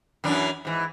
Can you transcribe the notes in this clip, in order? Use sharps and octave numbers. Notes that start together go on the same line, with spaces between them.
F#2 E3 D4
G#2 E3